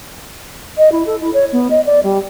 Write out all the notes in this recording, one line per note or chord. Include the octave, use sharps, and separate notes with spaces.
D#5
E4
A4
E4
C#5
B3
D#5
D5
G3